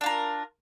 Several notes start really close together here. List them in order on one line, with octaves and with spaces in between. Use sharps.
D4 F4 A#4